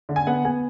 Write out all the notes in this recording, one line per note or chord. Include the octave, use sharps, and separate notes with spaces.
D3
G#5
B3 F#5
B3 G#5